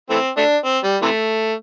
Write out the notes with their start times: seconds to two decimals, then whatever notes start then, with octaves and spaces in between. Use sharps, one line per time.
0.10 E3 A3 C4
0.37 A3 D4
0.65 C4
0.84 G3
1.02 C3 E3 A3